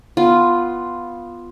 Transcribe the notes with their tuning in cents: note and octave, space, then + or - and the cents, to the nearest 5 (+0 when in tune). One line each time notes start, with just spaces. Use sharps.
B3 +0 F4 +0